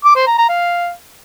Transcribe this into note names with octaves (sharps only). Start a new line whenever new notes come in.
D6
C5
A#5
A#5
F5